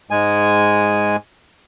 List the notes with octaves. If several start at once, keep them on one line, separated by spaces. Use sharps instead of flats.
G#2 G#3 G#5